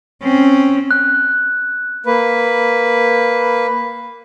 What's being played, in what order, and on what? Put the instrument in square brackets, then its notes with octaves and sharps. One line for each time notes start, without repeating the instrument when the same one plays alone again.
[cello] C4 C#4
[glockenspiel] F#6
[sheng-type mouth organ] A#3 B4